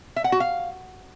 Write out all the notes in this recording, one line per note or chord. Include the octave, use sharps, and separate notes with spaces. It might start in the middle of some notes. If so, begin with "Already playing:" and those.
E5
F#5
F#4
F5